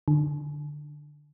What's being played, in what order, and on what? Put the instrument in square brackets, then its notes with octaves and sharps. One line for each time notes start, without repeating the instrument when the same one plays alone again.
[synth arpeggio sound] D3